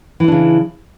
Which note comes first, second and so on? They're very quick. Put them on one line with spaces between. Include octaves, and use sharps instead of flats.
E3 E4 D4 C#3